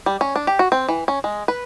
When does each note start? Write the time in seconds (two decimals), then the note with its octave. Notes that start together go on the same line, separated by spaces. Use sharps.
0.06 G3
0.21 C#4
0.36 D4
0.47 G4
0.59 F#4
0.72 C4
0.89 E3
1.08 C#4
1.24 G#3
1.48 B4